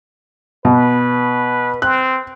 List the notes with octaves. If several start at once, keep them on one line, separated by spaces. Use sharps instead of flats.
B2 B4
C4 F#6